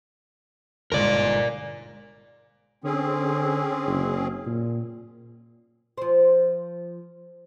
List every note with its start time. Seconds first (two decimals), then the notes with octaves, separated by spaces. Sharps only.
0.92 G1 G#2 A#4 D5
2.84 D3 C4 C#4 G#4
3.86 F#1
4.46 A#2
5.98 F3 C5